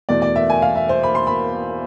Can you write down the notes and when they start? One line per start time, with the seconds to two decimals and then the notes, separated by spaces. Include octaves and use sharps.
0.09 E2 B2 A3 D5
0.22 D5
0.36 E5
0.50 G#5
0.62 F5
0.75 E5
0.89 C5
1.03 B5
1.15 C6
1.27 B5